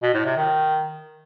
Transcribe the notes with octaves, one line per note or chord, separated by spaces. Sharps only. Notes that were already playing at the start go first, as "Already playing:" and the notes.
B2
A2
C3
D#3